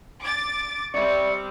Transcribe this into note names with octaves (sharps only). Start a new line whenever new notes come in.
D6 A6
G3 C4 D5 E5 C#6